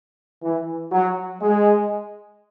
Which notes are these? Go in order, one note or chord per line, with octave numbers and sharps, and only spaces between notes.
E3
F#3
G#3